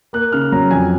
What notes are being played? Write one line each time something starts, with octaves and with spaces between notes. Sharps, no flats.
A#3 F#6
C#3 F6
F#3 A#5
F2 G#5